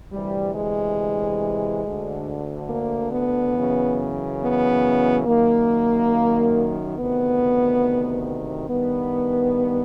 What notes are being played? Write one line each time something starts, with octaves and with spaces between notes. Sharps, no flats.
D2 C3 E3 G3
G#3
D2 D3
A#3
B3
F#2 C#3 E3
B3
F#2 D#3 A#3
D2 C3 D#3 B3
G2 D#3 B3